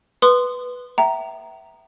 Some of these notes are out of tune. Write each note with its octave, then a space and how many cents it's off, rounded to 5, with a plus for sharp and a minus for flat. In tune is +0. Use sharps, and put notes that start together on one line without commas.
B4 +0 C6 -15 D#6 -20
E5 +0 G5 -40 A#5 +0